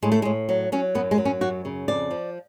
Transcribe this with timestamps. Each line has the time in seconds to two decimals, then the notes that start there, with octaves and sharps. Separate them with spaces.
0.02 A2 G#3
0.12 A3
0.22 A2 G#3
0.49 F#3
0.72 F#3 C#4
0.95 F#2 B3
1.11 G#3
1.18 F#3
1.25 C#4
1.41 F#2 F#4
1.65 C#3
1.88 F2 D5
2.11 F3